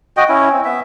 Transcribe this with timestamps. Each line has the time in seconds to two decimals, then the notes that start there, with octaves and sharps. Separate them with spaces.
0.17 F#4 D#5 G5
0.29 C#4 E4
0.52 C4
0.65 B3 E5